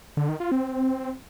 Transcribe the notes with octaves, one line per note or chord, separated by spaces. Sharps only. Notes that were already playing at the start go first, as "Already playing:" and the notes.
D3
D#3
F4
C4